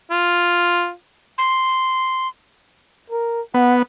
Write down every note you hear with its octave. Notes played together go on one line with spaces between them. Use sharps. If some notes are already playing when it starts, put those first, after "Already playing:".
F4
C6
A#4
B3 F#5